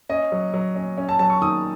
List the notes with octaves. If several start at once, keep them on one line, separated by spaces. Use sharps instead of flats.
C#4 D#5
F#3
F#3
C#4
C#4
A5
F#3 A5
C#6
D#3 D#6